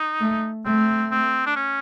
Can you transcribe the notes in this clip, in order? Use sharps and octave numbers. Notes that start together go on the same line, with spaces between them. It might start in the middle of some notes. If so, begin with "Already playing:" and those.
Already playing: D#4
A3
A3 C4
C4
D4
C#4